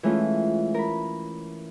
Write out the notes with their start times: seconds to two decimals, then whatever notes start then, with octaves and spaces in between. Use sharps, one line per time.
0.03 E3 G#3 A3 C#4 F4
0.74 A#4 B5